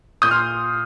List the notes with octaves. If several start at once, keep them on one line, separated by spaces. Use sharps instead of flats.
A#2 D#6 G6
C6 F6